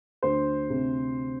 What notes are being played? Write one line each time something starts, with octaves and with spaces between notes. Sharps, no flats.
D2 C5
C3